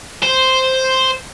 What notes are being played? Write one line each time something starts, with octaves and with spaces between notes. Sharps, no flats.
C5